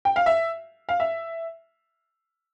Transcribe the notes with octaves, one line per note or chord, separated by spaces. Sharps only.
G5
F5
E5
F5
E5